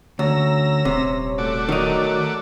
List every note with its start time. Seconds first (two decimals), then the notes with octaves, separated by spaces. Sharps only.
0.19 D2 C#4 A#5 E6
0.85 D#1 C3
1.38 A3 F#4 D5
1.69 D#3 F#3 D#4